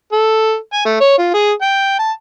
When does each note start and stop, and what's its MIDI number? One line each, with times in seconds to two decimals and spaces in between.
0.12 0.55 69
0.73 0.82 80
0.86 1.00 57
1.01 1.18 73
1.18 1.34 65
1.34 1.51 68
1.62 1.99 79
1.99 2.11 81